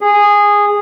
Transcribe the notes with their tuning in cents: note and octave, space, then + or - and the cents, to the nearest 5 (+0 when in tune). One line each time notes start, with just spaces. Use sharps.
G#4 -15